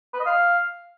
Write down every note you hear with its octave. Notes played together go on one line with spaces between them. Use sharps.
B4
D#5
F5